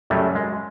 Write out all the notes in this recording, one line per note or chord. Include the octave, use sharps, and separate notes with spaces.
F#2 C#3 F#3 G3 A3
G#3